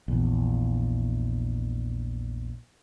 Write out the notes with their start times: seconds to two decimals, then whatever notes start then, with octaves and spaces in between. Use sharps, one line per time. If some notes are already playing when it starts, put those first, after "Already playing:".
0.08 A#1 E2